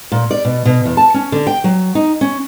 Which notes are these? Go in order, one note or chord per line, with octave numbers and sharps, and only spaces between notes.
A#2
D5
B2
B2
E2
A5
C#4
D3
G5
F#3
D#4
C#4